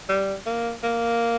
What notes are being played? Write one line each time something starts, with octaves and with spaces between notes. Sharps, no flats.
G3
A#3
A#3